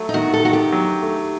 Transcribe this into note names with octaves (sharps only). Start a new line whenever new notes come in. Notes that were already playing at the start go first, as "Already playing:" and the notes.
Already playing: F#3 A3
D#4
D#3 F#4
A4
D#3 F#4
G4
F#3
A3